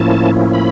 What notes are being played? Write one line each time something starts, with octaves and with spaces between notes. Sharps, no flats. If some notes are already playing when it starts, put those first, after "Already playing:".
Already playing: A2 F3 A#3 C#4 E4 A5
B5